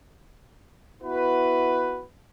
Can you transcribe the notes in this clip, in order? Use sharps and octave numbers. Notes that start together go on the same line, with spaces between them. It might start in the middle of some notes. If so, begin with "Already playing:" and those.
B3 E4 F#4 B4